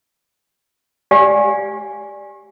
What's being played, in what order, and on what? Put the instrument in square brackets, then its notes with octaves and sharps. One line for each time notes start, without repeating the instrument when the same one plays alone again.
[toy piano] G4 D5 F5 G#5